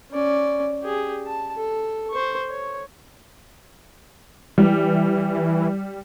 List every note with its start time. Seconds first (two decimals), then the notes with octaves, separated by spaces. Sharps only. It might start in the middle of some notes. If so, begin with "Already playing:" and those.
0.11 C#4 D5
0.82 G4 G#4
1.26 A5
1.56 A4
2.10 C5 C#6
2.50 C#5
4.58 E3 G3